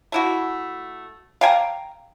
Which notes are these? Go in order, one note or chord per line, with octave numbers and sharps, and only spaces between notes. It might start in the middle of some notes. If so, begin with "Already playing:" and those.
A3 E4 F#4
F5 G5 G#5 A#5